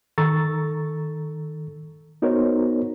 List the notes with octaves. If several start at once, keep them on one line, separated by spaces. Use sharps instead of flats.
D#3 A4 A#5 C#6 E6 A6
B3 D#4 F#4 A#4 C5 C#5